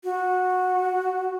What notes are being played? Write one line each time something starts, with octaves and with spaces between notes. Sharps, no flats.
F#4